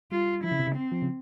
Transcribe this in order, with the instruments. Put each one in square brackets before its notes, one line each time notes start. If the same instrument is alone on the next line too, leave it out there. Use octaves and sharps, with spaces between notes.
[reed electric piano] G3 [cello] F4
[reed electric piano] F3 [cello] E4
[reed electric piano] C#3
C3
C#3
[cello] C4
[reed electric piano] F3
C#3